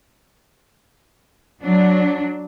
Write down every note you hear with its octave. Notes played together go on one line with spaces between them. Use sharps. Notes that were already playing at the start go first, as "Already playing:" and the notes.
F#3 D4